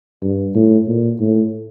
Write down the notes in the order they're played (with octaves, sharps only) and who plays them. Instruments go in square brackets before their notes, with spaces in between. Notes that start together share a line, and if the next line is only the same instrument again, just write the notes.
[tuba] G2
A2
A#2
A2